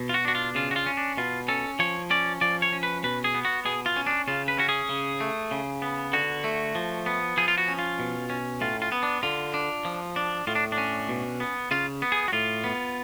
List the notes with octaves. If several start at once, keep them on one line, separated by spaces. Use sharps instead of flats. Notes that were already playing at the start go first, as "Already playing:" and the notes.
Already playing: B2
F4
F#4
D4 F#4
F4
C#3 F4
F#4
F4
C#4
D4
B2 F4
C#4 A4
F3 C#5
C#4 D5
F3 D5
C#5
C#4
B4
B2 B4
G#4
B3
F#4
B2 G#4
F4
C#4
D4
C#3 F4
B4
C#4 F#4
G#4
C#3
A3
C#3
B3
D3 F#4
A3
F3
B3
F3 G#4
F4
F#4
C#4
F4
B2
C#4
A2 F4
F4
B3
D4
D3 F4
D4
F3
D4
A2 F4
D4
D4
C#4
B2
B3
C#3 F4
B3
G#4
F#4
A2 F4
B3